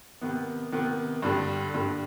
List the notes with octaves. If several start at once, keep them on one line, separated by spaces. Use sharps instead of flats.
C3 D#3 B3
C3 D#3 B3
G2 D3 G3
G2 D3 G3